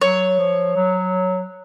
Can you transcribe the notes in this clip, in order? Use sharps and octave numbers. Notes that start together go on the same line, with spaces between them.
F#3 C#5
F3
F#3